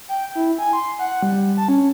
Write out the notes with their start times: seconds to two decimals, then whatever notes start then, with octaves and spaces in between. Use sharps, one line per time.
0.09 G5
0.35 E4
0.59 G#5
0.73 C6
0.99 F#5
1.23 G3
1.57 A5
1.69 C#4